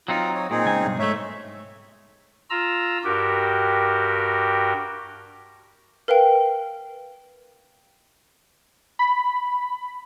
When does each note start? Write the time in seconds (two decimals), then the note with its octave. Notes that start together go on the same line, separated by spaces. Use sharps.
0.08 F#3 C4 D#4 F4
0.34 C#5
0.51 A#2 C4 D#4 G#4
0.65 C#2 G#5
0.83 B1 G2
0.99 G#2 A3 C#5 E5
2.50 F4 A#5 E6
3.04 G2 F#4 G4 A#4
6.08 A#4 B4 F5 G5
8.99 B5